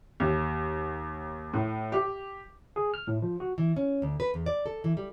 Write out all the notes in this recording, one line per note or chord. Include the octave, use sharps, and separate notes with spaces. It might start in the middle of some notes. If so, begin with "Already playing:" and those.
D#2
A2
G4
G#4
F6
A2
F3
F#4
E3
C#4
D2
B4
E2
D5
A4
E3
G3